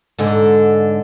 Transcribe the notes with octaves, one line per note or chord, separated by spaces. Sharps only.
G#2 D3